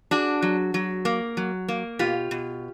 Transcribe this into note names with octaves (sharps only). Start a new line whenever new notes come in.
D4 F#4 G#4
F#3
F#3
A#3
F#3
A#3
B2 F4 G4
B2